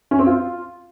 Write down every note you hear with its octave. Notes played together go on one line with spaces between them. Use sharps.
C#4
C4
F4